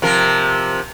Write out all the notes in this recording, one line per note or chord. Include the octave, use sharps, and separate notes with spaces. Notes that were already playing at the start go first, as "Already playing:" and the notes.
C3 F3 A#4